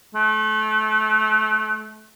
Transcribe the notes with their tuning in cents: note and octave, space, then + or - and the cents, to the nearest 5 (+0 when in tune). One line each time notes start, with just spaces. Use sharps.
A3 -30